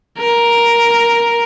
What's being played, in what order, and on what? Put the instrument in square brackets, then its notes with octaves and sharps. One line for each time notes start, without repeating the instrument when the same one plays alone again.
[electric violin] A#4